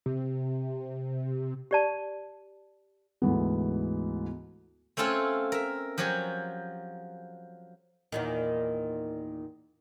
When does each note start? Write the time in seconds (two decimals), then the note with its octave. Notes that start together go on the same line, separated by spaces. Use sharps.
0.06 C3
1.71 G4 D5 A5
3.22 D2 G#2 E3 B3
4.97 A3 C4 C#4 F4 A4 G#5
5.52 A#4 E5
5.98 F3 F#3 G4 C#5 G#5
8.12 E2 A#2 D#3